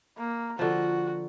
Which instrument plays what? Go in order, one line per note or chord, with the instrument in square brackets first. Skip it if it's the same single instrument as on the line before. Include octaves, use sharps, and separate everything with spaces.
[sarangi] A#3
[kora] D3 F3 [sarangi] F#4